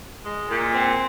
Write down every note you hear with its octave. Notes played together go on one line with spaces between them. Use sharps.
G#3
A#2
C4